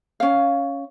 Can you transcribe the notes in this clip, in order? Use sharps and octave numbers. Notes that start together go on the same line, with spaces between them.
C#4 F5